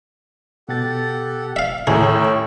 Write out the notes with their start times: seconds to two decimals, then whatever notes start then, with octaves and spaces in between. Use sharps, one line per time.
0.69 B2 G4 A4 F#5 A6
1.56 E5 F5
1.87 D#2 A2 C#4 G#4 C#5 E5 G5 A#5